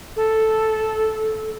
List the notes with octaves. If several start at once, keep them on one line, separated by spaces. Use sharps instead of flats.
A4